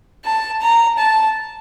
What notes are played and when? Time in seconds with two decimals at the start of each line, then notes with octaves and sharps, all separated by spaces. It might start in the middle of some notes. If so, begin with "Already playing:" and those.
0.25 A5
0.61 A#5
0.98 A5